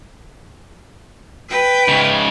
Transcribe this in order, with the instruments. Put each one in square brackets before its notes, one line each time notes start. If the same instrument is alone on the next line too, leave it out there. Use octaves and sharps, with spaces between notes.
[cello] B4 G5
[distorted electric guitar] G#2 C#3